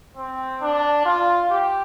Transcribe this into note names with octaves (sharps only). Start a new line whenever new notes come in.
C4
D4
F4
G4